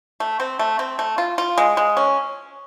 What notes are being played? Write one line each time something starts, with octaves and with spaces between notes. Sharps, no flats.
A3
C4
A3
C4
A3
F4
F4
G#3
G#3
C#4